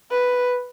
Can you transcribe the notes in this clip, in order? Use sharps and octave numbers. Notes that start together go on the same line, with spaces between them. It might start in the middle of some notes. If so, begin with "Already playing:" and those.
B4